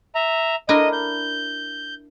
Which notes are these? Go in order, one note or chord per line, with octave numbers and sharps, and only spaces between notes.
E5 A#5
D4 E4 A#4 D#5
G6